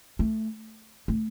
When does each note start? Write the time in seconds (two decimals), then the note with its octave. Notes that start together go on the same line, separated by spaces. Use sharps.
0.19 A3
1.08 A3